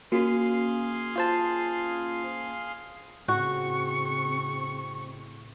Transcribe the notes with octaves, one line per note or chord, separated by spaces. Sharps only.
A#3 C#4 F#4 G#4 F5 C6
F4 C5 A5
A2 C#3 C4 F#4 C#6